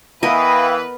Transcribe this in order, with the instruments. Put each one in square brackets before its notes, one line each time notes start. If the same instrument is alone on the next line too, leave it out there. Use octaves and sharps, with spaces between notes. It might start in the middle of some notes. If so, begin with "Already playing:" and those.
[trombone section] E3 [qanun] B3 A#4 D#5 [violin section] B4 [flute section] F5 G5 B5